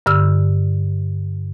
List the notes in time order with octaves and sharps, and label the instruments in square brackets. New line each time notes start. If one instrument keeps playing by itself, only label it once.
[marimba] G2 D3 E6 F6